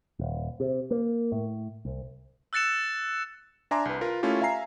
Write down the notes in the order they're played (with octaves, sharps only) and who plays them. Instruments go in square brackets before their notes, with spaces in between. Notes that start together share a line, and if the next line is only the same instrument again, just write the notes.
[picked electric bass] D#1
C3
A#3
A2
C2
[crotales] E6 F#6 A6 C#7 E7
[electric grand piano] D4 E5 G#5 A#5 C6 D6
C2 B4
F4 A#4 B4
A3 C#4 E4 F4 G4
E5 F5 G#5 A#5 C7